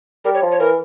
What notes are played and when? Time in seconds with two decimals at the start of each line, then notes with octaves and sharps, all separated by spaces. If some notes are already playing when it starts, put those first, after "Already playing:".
0.25 G3 A#4
0.34 C#5
0.43 F3
0.52 C#5
0.60 E3 A#4